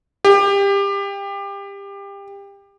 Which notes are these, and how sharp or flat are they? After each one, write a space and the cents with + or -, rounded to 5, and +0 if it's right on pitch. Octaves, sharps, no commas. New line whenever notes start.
G4 +25